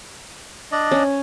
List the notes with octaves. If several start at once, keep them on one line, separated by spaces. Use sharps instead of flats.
D4 D5 D#5
C#4